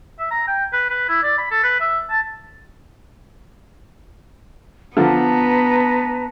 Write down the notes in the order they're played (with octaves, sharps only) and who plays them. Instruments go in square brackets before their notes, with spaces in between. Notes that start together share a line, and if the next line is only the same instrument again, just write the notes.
[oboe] E5
A#5
G5
B4
B4
E4
D5
B5
A4
B4
E5
A5
[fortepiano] D3 F3 [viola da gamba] B3 [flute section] B4 A5 A#5